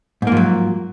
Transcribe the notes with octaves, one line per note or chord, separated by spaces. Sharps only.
G#2 F3 F#3 A#3